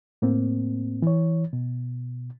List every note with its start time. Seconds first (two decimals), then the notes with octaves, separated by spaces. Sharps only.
0.22 A2 A#3 C4
1.02 E3 C#5
1.53 B2